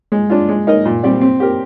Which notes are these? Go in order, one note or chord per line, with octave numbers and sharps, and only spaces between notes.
G#3
D4 F4
G#3
D#4 A#4 D#5
A#2
G3 C4 G4 D5
C4
G4 A#4